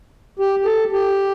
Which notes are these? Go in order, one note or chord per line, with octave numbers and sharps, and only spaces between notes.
G4
G4
A4
G4